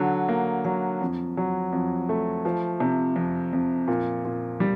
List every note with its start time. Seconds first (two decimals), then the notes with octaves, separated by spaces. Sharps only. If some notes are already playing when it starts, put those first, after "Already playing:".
Already playing: D3 F#3
0.29 A#3
0.65 F#3
1.01 F2
1.37 F#3
1.73 F2
2.09 A3
2.45 F3
2.80 C3
3.16 F2
3.53 F2
3.88 A#2
4.25 A#2
4.60 G3